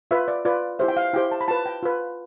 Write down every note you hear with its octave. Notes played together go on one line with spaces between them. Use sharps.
F4 B4 E5
D5
F4 B4 D5
E4 G4 C5 E5
G5
F5
E4 G4 C5 G5
A5
B5
F4 B4 A5
G5
F4 B4